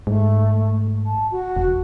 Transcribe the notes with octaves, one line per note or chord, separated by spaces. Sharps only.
G#2 A3
A5
F#4
F1